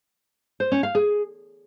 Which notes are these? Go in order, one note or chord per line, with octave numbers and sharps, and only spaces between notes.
C5
C#4
F5
G#4